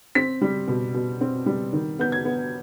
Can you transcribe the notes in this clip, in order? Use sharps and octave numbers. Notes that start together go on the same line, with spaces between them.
C4 B6
G3
B2
B2
C4
G3
D#3
B3 G6
G#6
B3